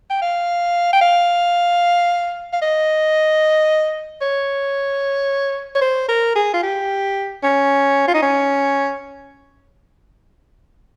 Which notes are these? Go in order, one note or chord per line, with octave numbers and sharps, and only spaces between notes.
G5
F5
G5
F5
F5
D#5
C#5
C#5
C5
A#4
G#4
F4
G4
C#4
F4
D#4
C#4